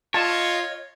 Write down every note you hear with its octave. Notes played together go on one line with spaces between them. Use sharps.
F4 C#5 D#5 A5